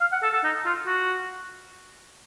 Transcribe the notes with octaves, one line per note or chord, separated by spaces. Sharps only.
F5
F#5
A4
A4
D#4
F4
F#4